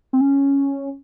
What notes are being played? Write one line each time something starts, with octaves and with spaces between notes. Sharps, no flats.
C4
C#4